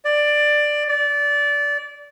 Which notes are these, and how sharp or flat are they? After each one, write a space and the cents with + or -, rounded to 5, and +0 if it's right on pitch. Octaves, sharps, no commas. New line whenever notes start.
D5 +10
D5 -20